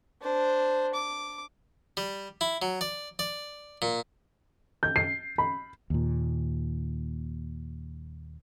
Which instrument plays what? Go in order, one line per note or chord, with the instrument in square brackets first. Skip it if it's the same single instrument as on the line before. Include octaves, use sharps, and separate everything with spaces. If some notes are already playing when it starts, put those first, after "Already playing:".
[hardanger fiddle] D4 C5
D6
[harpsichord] G3
E4
F#3
D5
D5
A#2
[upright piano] G6
C7
B5
[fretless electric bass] D#2 A#2